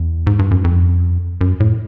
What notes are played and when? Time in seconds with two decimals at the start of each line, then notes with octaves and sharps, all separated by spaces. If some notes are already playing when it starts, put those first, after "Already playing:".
Already playing: E2
0.27 G#2
0.39 G2
0.51 F#2
0.64 F2
1.41 F#2
1.60 A2